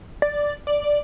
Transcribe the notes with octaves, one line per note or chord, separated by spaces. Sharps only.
D5
D5